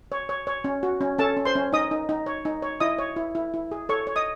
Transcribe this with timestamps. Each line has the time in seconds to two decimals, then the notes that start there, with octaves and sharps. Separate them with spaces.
0.12 C#5
0.29 C#5
0.47 C#5
0.64 C#4
0.83 F#4
1.01 C#4
1.18 C#4 A4 A5
1.37 C#4
1.45 C5 C6
1.55 C#4
1.73 D#4 D#5 D#6
1.91 D#4
2.09 D#4
2.26 C#5
2.45 D#4
2.62 C#5
2.80 E4 D#5 D#6
2.98 C#5
3.16 E4
3.35 E4
3.54 E4
3.72 G#4
3.89 A4 C#5 C#6
4.07 C#5
4.16 D#5 D#6